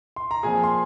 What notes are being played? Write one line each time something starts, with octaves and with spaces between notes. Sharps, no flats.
C6
A#5
A#2 F3 C4 G#4 G#5
C6